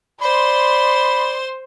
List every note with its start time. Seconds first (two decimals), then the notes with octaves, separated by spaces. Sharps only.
0.22 C5 D5 B5 C6